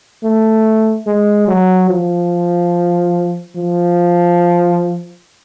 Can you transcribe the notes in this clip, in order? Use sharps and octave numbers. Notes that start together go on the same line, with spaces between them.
A3
G#3
F#3
F3
F3